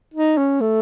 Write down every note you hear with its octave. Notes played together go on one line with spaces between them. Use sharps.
D#4
C#4
A3